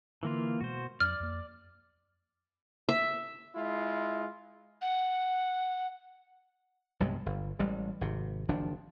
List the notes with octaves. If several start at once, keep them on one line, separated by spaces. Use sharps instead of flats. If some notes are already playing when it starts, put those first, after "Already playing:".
D3 E3 A#3 F4
B2 G#3 F#4 C5
F2 F#3 D4 D5 F6
F2 A#3
E5
G#3 E4 F4
F#5
B1 G2 C3 G#3
G1
A1 G3 G#3
G#1 C3
F#1 D#3 F3 D4